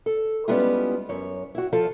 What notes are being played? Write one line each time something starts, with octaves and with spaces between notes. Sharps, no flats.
A4
G3 G#3 B3 C#4 E4 F4
F#2 C#5
E4 F#4
F3 F4 A4